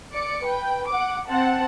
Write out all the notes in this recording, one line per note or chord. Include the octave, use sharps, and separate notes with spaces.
D5 D6 C#7
B4 G5
F#5 D6
C4 F#5 A5